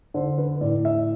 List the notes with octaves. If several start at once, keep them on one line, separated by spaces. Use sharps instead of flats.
D3 C5
B4
A2 D5
E5